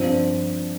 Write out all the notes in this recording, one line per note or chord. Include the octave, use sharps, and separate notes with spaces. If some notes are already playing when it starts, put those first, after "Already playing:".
Already playing: G2 F3 C4